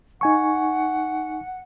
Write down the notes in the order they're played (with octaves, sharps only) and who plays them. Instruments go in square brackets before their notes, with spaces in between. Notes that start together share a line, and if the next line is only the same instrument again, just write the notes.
[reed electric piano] D#4 G#5 C#6 [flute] F#5